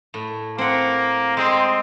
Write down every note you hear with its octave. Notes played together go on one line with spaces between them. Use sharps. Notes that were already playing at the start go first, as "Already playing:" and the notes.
A2
A#3 C4 F#5
G#3 C4 G#4 D#5